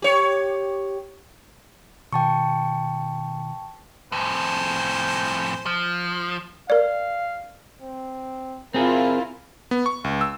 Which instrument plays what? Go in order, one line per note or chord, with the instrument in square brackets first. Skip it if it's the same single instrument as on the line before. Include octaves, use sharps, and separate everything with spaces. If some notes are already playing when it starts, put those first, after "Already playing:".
[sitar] G4 C#5
[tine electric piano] B2 D#3 [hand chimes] G5 A5 C#6
[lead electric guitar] F2 A2 [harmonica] C5 G#5
[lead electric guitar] F3
[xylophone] A#4 D5 [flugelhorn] F5
[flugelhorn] C4
[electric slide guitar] C4 G#4 [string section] E4 F4 [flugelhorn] A#4
[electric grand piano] B3
C#6
C#2
E6